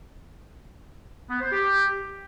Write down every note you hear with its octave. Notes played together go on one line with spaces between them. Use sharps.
B3
C5
G4